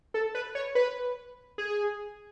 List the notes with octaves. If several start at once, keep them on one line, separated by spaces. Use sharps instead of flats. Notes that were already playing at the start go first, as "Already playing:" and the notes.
A4
B4
C#5
B4
G#4